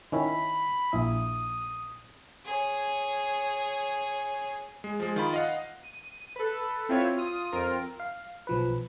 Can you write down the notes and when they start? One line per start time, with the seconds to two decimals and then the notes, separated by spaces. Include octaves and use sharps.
0.12 D#3 C#4 E4 B5
0.93 A#1 E4 D#6
2.46 G#4 C#5
4.84 G#3
4.99 F3 G#3
5.16 D#3 F4 B5
5.34 D#5 F5 F#5
5.83 D#7
6.36 A4 B4
6.89 C4 E4 F4 B4 C#5 E5
7.17 F4 D#6
7.52 F2 C4 F4 A#4 D7
8.00 F5
8.47 B1 F3 B4